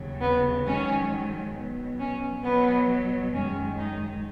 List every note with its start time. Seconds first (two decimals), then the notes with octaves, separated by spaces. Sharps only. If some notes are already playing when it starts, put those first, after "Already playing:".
Already playing: D#2 C#3 F#3
0.21 B3
0.66 G#2 D#3 F#3 C#4
1.55 B2 F#3
2.00 C#4
2.44 B2 F#3 B3
3.34 F#2 D#3 G#3 C#4
3.78 D#4